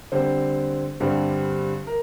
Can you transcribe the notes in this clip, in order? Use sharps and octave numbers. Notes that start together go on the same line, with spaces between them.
D3 G3 C4 C5
G2 D3 G3 C4
A#4